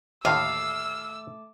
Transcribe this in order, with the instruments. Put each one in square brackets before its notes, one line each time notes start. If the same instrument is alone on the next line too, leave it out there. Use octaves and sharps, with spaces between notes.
[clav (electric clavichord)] D#2 A2 D3 [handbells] A3 A5 D6 [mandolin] F5 [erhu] E6